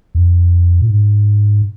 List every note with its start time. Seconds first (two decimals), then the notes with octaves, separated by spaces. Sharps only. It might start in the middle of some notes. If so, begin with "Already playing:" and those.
0.15 F2
0.81 A#2
0.87 G#2